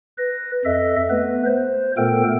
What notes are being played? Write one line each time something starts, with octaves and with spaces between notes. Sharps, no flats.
B4 A#6
F2 A4 D#5 E5
A3 B3 B4
C5
A#2 A3 B3 A4 A#4 G5